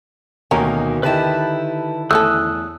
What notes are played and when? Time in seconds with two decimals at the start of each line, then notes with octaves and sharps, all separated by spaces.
0.51 D2 B2 D#3 A#3 C#4 D#4 A#4
1.03 D3 D#3 E4 G4 B4 D#5 A5
2.11 E2 A3 C#4 A4 D#6 E6 F#6